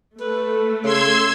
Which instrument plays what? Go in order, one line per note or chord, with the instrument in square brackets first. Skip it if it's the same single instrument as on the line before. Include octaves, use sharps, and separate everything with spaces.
[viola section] A3 [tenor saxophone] B4
[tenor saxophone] C#3 [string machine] C6 E6 G#6